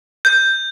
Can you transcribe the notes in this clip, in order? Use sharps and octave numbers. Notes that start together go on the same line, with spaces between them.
G6